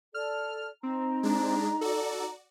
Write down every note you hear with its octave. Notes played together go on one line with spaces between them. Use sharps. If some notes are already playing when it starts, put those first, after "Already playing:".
A4 D5 F6
C4 D#4 A#5
G#3 D4
F#4 A4 D5